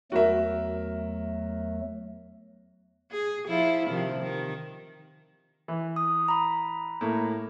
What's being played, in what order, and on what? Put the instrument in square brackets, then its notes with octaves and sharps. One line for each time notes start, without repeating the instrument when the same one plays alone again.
[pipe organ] E2 F#3 A3 [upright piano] F#4 A#4 E5
[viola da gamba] G#4
F3 E4 F4
C3 D#3 F3
D#3
[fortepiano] E3
[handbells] D#6
A#5 B5
[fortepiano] A2 A#3